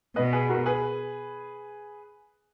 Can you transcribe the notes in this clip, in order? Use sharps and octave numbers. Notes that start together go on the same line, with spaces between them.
B2 B4 D#5
G#4 B4
F#4 A#4
G#4 B4